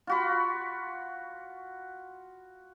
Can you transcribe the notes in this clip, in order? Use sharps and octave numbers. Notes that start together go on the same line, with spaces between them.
F4 F#4 B5